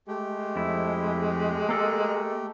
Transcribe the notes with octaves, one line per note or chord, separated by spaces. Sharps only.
G#3 A3 G4
F2 E4
A#3 A4 A#4